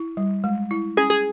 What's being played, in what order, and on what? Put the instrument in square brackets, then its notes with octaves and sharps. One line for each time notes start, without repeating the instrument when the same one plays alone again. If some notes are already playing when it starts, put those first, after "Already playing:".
Already playing: [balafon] E4
G3
G#3
E4
[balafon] C#4 [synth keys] G#4
[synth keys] G#4